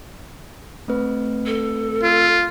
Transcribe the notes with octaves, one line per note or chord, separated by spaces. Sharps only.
A3 C4 B4
A4
F4